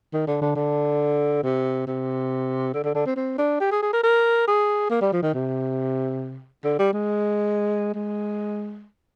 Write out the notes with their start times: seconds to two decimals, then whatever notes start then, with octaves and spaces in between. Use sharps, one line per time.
0.13 D#3
0.27 D3
0.41 D3
0.56 D3
1.43 C3
1.87 C3
2.74 D3
2.84 D3
2.95 D3
3.06 C4
3.16 C4
3.38 D4
3.60 G4
3.71 G#4
3.83 G#4
3.93 A#4
4.04 A#4
4.48 G#4
4.90 A#3
5.01 G3
5.12 F3
5.23 D#3
5.34 C3
6.64 D3
6.79 G3
6.93 G#3
7.94 G#3